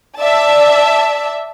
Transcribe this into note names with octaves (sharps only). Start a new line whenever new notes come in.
D5 E5 A5